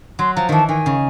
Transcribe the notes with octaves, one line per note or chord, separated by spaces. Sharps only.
F#3 C6
F3 A#5
D#3 E3 A5
D#3 G#5
C#3